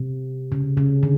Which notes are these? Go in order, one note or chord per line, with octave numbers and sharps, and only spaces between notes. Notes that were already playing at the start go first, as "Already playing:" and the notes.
Already playing: C3
C#3
C#3
D3